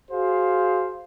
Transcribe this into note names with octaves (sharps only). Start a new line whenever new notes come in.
F#4 G#4 C5 F5